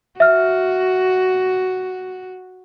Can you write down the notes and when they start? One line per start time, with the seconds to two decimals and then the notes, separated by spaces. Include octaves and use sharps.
0.20 F#4 E5 F6